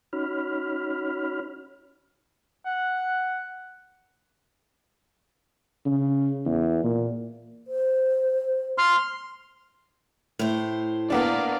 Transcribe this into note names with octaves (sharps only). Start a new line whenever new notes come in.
C#4 D#4 F#4 C#5 B5 F6
F#5
C#3
E2
A#2
C5
C6 F6
A2 C5
A#3 B3 D4 D5 F5